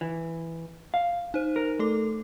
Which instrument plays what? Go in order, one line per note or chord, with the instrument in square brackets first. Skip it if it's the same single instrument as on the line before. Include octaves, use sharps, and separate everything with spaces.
[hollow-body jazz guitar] E3
F5
[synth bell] D#4 C5
[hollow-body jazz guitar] A#4
[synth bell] A3 A4 D6